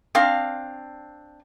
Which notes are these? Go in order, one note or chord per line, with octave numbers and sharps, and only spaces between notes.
C4 D4 F5